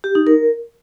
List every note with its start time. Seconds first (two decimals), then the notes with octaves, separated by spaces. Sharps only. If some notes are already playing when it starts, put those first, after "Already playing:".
0.04 G4
0.15 D#4
0.27 A#4